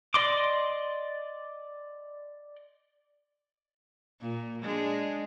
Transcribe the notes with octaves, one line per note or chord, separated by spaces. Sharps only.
D5 D#5 C6 D6
A#2
G#3 D4